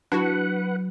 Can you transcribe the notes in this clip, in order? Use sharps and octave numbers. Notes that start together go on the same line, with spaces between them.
F#3 D4 E4 F#4 B4 F#5